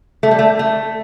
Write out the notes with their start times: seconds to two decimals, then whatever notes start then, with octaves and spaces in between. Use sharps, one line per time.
0.23 A3
0.31 G3
0.39 A3
0.59 A3